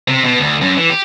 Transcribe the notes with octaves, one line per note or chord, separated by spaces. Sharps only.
C3
B2
D2
F#2
E3
G4